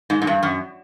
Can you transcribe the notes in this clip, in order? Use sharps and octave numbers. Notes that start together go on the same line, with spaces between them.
G#2
G#2
G2
F#2